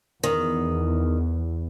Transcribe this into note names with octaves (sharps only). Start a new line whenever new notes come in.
E2 D#3